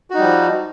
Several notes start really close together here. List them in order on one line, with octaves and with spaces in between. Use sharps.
F#4 D#4 G3 F3